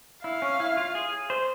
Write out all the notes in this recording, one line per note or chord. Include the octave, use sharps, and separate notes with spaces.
E4 F5
C#4
E4
F4
G#4
C5